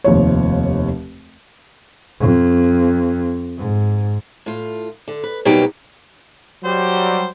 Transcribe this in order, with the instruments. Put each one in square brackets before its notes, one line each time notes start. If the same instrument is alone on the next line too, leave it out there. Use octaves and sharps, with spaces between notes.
[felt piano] F1 D#2 F3 C#5
[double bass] F2
G#2
[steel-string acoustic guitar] A2 F4
D3
B4
B2 F#3 G3 A#3 D#4 G4
[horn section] F#3 G3 C5